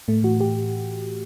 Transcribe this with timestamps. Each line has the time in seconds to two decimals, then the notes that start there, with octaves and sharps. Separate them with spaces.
0.08 A2 A3
0.24 E3 F#4
0.40 A2 G4